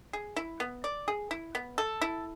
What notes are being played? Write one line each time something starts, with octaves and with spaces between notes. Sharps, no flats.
G#4
E4
B3
D5
G#4
E4
B3
A4
E4